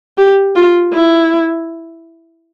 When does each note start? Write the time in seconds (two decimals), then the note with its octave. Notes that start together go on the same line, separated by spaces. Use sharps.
0.18 G4
0.55 F4
0.93 E4